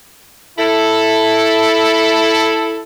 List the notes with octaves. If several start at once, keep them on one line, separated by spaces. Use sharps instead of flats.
E4 A4